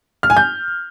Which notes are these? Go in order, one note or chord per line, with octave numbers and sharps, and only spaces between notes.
F6
G#5
G6